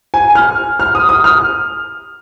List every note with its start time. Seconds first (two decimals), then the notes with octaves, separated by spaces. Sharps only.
0.14 G#5
0.35 F6
0.80 F6
0.95 D#6
1.09 D#6
1.24 F6